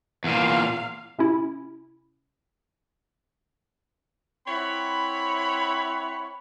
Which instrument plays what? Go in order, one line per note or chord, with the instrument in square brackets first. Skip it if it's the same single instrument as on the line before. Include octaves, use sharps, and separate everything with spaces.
[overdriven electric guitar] E2 A#2 [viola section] F5
[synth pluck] C3 C#4 E4
[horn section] C4 E4 C#5 F#5 B5